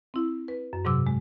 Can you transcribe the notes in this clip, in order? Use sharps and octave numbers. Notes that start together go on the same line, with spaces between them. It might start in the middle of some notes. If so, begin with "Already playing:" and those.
C4 E4
B4
F#2
G#2 C3 F#3 D6 E6
G#3